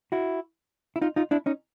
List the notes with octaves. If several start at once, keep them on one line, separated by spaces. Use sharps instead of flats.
E4 F#4
E4
D#4 F4
D#4 F4
D4 E4
C#4 D#4